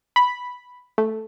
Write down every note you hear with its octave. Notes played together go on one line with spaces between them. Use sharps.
B5
A3